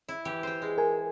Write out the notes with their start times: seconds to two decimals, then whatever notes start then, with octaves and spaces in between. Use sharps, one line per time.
0.08 E4
0.25 E3 G4
0.43 C5 G5
0.62 G#3
0.78 A#4 G#5